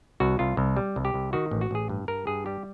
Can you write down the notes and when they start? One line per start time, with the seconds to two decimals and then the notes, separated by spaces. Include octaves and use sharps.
0.20 C2 F#4
0.39 C2 F4
0.57 C2
0.77 G3
0.96 C2
1.05 G4
1.14 C2
1.33 D#3 F#4
1.51 A1
1.61 F#4
1.71 A1 G#4
1.89 G2
2.08 G2 A#4
2.27 G2 G#4
2.46 G3 G4